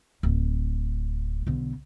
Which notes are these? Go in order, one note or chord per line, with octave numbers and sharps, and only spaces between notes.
D1
B1 D3